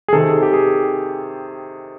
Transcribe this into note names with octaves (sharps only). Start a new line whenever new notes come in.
G#4
C3 D#3 A4
G4
G#4